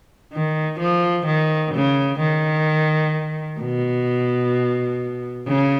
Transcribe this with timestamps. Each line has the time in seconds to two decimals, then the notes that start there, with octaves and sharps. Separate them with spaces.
0.33 D#3
0.80 F3
1.26 D#3
1.74 C#3
2.19 D#3
3.60 B2
5.47 C#3